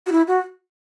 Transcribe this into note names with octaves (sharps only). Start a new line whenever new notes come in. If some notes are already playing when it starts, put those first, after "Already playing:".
F#4
E4
F#4